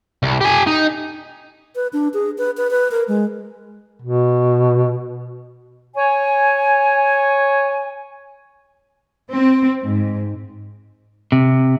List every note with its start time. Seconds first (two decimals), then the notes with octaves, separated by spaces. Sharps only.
0.23 C2
0.41 G4 G#5
0.67 D#4
1.75 B4
1.93 D4
2.14 G#4
2.38 B4
2.57 B4
2.71 B4
2.91 A#4
3.08 G#3
4.02 B2
5.95 C#5 G#5
9.31 C4
9.83 G#2
11.32 C3